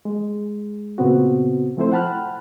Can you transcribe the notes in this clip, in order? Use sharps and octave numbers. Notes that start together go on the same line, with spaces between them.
G#3
A#2 C#3 B3 C4 F#4
F3 A3 C4 E4 A4 C5
F#5 G5 A5 B5 F6 F#6